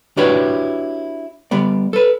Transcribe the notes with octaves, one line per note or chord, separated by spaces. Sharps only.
D4 E4 F#4 G4 B4 C#5
G3 B3 D5
A4 B4